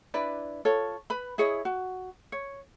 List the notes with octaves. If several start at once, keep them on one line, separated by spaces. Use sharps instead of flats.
D4 E4 B4 D5
F4 A4 C#5
B4 B5
E4 G#4 C#5 D#5
F#4
C#5